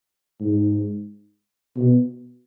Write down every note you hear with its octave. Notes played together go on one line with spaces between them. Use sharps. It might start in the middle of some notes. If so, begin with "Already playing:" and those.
G#2
B2